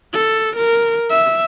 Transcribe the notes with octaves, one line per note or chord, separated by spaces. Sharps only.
A4
A#4
E5